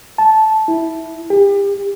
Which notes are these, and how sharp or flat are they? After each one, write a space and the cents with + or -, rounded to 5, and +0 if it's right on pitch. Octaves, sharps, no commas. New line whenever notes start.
A5 -10
E4 -5
G4 +35